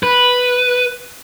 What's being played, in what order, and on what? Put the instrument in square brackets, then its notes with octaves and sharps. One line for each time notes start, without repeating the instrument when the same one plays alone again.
[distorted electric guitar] B4